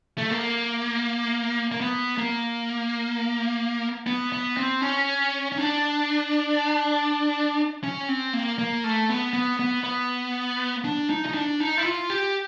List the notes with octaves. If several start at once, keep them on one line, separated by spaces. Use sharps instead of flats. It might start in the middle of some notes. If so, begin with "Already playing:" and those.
A3
A#3
A#3
B3
A#3
B3
B3
C4
C#4
C#4
D4
C#4
C4
A#3
A#3
A3
B3
B3
B3
B3
D4
D#4
D#4
D4
D#4
E4
F4
G4